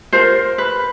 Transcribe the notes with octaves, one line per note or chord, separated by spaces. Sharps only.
F4 A#4 C5
B4